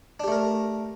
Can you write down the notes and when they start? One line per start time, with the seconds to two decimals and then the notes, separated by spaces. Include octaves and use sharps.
0.20 D4
0.24 G4
0.28 A3
0.32 A#4